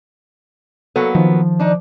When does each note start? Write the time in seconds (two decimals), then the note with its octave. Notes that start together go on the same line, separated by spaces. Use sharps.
0.96 F#3 A#3 B3 A4
1.15 D#3 F3
1.60 D4 D#4